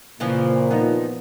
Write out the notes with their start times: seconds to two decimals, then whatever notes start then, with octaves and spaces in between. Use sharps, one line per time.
0.20 A#2 C#3 E3 F3
0.71 F3 B3 D#4